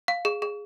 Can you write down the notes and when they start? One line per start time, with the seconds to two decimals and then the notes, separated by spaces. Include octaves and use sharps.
0.08 F5
0.25 G#4
0.42 G#4